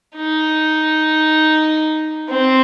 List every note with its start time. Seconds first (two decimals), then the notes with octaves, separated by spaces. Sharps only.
0.16 D#4
2.29 C4